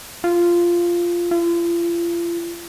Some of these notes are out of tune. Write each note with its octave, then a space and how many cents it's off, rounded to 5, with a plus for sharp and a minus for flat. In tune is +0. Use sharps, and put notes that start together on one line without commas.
F4 -10
F4 -40